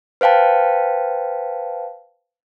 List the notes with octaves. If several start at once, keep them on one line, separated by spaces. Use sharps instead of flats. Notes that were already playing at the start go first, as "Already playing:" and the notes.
B4 C5 F5 G5 A5